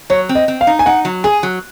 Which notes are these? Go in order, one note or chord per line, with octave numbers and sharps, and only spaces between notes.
F#3 C#5
C4
D#5
C4
F5
D#4
G#5
D#4 F#5
F#3
G#4 G#5
F#3